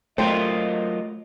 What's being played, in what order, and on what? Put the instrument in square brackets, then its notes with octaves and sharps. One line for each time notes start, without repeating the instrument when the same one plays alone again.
[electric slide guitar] F#3 F4 A#4 [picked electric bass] A3 [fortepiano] C5 G5 [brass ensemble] D#5